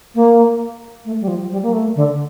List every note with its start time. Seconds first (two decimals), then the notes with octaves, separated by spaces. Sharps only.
0.14 A#3
1.04 A3
1.21 G3
1.27 F3
1.50 G3
1.62 A#3
1.72 A3
1.95 D3